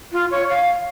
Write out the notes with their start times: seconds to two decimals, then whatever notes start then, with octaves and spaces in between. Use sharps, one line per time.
0.12 F4
0.31 C#5
0.49 F5